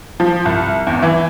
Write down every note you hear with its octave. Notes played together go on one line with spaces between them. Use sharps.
F3
C2
E2
E3